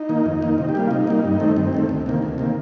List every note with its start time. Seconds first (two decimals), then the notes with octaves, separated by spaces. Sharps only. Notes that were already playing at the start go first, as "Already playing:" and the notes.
Already playing: D#4
0.09 D#3 A#3
0.26 F2
0.42 D#3 A#3
0.58 C3 D#4
0.69 G4
0.75 G3 A#3 F4
0.91 C3 D#4
1.07 G3 A#3
1.24 G2
1.40 D#3 A3 C4
1.56 G2 C4
1.73 D#3 A3 C4
1.89 D2
2.06 C3 D#3 A#3
2.22 D2
2.38 C3 D#3 A#3